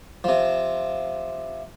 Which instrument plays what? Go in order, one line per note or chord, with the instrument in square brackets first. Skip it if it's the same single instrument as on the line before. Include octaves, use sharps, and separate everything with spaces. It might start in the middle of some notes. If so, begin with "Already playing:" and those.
[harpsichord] C3 F3